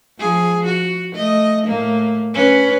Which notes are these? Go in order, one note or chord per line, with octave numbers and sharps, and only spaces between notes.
F3 G#4
F#4
A3 D#5
A2 A#3
C#4 B4